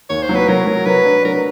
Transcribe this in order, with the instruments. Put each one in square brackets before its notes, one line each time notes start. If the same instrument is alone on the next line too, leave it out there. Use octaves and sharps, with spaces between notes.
[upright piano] D#2 [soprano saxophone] C#5
[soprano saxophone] C5
[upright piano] F#3
[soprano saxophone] B4
[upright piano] F#3 [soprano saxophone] A#4
[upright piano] F#3
[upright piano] F#3 [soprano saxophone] B4
[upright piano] D4
[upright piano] F#3 [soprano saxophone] A#4
[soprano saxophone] B4